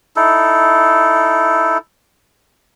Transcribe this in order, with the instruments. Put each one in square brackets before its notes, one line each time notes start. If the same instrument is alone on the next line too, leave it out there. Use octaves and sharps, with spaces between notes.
[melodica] D#4 E4 A4